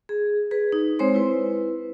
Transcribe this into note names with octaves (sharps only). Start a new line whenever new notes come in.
G#4
G#4 B4
D#4
G#3 C4 C5 C#5 C6
E4 B4